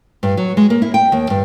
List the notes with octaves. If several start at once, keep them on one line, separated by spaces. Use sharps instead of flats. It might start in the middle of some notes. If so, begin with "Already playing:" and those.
G2
F#3
G#3
A#3
E4
G5
D#2
G2